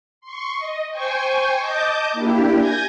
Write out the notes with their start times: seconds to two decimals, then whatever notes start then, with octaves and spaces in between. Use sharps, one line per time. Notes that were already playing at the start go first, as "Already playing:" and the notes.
0.21 C6 C#6
0.57 D#5
0.91 C5 G5 G#5 C#6
1.58 D#5 A5 D6 G6
2.13 A#3 D4 E4 G4
2.55 G#5 G6 G#6 A#6